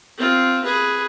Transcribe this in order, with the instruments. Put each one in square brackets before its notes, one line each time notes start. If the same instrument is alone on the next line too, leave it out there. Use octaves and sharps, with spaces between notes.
[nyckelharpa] C4 F4
G#4 B4